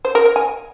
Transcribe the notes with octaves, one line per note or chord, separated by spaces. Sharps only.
C5
A#4
A#4
G#5